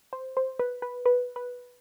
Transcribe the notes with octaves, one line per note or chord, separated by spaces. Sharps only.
C5
C5
B4
B4
B4
B4